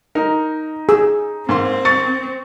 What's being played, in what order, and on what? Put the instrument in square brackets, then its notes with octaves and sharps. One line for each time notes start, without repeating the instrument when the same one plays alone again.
[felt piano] D#4 [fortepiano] A#4
[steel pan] G#4 [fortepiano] E6
[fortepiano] G#2 A#3 C6 [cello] C4
[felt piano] C#6 A6